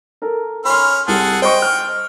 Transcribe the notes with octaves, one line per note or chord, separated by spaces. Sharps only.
A4 A#4
C#4 B5 C6 F6
C2 G#4 A4 F#5
C5 D#5 G5 C#6
F6